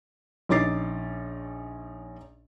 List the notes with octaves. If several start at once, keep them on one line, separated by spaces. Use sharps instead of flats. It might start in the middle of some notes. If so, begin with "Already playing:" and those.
A#1 C#4 D#4 D6 A6 C7